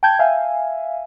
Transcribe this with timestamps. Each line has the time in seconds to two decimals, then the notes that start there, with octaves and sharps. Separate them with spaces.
0.03 G5 A5 G6 G#6
0.19 E5 F5 G#5